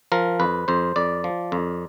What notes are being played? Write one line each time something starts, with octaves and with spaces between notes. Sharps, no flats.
F3 A#4
F2 B4
F2 C5
F2 D5
F3
F2